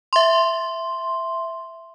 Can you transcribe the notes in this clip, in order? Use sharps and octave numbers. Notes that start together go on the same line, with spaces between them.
E5 C6